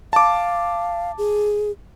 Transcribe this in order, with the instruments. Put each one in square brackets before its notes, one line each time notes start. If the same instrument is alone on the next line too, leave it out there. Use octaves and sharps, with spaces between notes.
[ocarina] F5 [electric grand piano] A5 D6
[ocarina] G#4